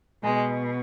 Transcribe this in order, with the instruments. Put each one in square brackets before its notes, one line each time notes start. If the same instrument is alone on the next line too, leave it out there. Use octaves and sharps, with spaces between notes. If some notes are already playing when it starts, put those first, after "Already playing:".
[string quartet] B2 G#3